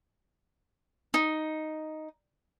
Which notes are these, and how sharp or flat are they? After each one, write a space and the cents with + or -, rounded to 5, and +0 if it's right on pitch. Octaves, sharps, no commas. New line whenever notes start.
D#4 +0